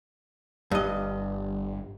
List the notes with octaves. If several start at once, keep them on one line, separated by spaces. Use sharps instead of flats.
G1 G2 D#5